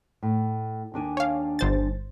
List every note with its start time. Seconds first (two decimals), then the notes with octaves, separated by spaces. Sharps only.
0.23 A2
0.94 D#2 D4 G#5
1.17 C#5 F5
1.59 G1 C5 A6